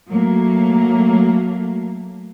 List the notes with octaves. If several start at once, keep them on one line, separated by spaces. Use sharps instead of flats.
F#3 A3 A#3